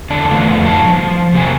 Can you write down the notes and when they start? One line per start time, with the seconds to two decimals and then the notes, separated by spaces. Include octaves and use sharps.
0.10 E2 D3 D5 A5
0.31 F2 A3 B3 F4
0.65 F#2 F#3 D#4 A5
0.86 F3
1.33 E2 C3 A#3 G4 A#4 G#5